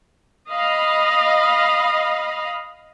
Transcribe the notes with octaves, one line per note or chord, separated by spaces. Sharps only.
D#5 F5 B5